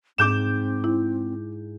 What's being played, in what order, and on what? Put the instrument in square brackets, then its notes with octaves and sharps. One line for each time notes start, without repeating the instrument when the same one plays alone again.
[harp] G#2 [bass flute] C4 [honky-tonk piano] D6 G6 E7
[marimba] E4